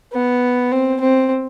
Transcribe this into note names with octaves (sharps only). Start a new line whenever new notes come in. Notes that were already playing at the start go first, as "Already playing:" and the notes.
B3
C4
C4